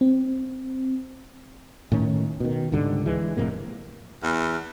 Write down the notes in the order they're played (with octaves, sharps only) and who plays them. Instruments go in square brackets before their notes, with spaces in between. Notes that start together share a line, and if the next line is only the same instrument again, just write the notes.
[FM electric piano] C4
[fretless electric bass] A2 D#3 C#4
B2 D#3
C#2 G#2 D3 G3
E3 G#3
F1 A2 C3 A#3
[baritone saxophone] E2